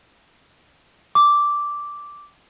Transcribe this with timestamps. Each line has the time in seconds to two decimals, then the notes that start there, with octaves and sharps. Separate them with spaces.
1.15 D6